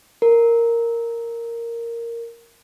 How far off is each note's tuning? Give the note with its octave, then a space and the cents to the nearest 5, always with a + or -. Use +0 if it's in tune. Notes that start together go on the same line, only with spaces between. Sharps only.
A#4 -5